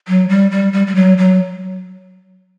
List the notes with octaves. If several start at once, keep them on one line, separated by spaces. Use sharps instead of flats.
F#3
G3
G3
G3
G3
F#3
F#3